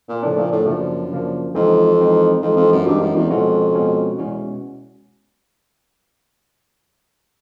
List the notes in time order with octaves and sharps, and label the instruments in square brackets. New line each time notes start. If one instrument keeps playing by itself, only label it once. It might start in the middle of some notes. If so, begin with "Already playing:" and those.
[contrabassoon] A#2
[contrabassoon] A2 [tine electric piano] C#3 F3 A#3 D4
[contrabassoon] A#2
A2
[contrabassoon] F#2 [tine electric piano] C#3 F3 A#3 D4
[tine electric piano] C#3 F3 A#3 D4
[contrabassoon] F2 [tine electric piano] E3 G#3 C4 D#4
[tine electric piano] E3 G#3 C4 D#4
[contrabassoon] F2 [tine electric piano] E3 G#3 C4 D#4
[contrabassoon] F2
F#2
[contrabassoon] G2 [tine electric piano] E3 G#3 C4 D#4
[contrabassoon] F#2
E2
[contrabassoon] F2 [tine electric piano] B2 G#3 C#4 F#4
[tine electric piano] B2 G#3 C#4 F#4
[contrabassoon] E2 [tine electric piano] B2 G#3 C#4 F#4